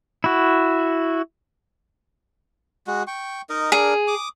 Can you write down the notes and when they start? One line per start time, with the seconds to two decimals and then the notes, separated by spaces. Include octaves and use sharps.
0.24 E4 F#4
2.87 G#3 F#4
3.07 G5 C#6
3.50 D#4 A#4 D#5
3.72 D4 G#4 A#4
4.08 D6 D#6